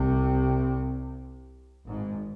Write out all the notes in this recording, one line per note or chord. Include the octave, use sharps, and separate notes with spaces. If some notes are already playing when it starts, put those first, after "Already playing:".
Already playing: C2 C3
G#1 G#2